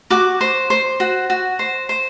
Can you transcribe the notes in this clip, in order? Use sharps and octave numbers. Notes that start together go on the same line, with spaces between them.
F#4 D6
C5
C5
F#4
F#4
C5
C5